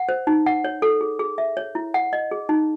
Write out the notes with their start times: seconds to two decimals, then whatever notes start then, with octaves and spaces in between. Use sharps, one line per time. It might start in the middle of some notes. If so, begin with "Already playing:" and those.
Already playing: F#5
0.09 C5
0.27 D#4
0.46 F#5
0.64 C#5
0.82 A4
1.01 G#4
1.19 G#4
1.38 E5
1.57 C#5
1.75 E4
1.94 F#5
2.13 D#5
2.31 G#4
2.49 D#4